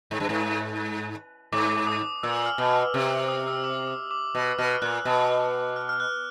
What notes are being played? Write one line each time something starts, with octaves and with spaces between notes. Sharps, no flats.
G#2
G2
G#2
G#2 D6
D#6
A#2 E6
F6
B2
F6
C3 E6
D#6
E6
D6
D#6
D6
B2 E6
B2 F6
A#2 F#6
B2
F6
F6
F#6